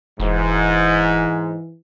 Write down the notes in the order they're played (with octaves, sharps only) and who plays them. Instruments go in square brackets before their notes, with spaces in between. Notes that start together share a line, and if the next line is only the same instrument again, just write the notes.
[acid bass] E1 [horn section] G#2 [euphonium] E3